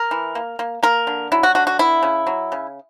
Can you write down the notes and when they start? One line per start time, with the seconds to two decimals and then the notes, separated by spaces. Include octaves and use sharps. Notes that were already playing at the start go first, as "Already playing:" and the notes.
Already playing: A#4
0.11 E3
0.35 A#3
0.59 A#3
0.83 A#3 A#4
1.07 D3
1.32 F#3 E4
1.43 F#4
1.55 D3 F#4
1.67 F#4
1.79 B3 E4
2.03 C#3
2.27 F#3
2.52 C#3